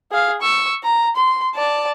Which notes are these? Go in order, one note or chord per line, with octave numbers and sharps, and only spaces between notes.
G#4 F5
C#6 E6
A#5
C6
D5 A5